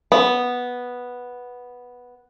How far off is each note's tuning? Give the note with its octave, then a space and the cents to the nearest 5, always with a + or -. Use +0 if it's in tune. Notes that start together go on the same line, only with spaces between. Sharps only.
B3 -5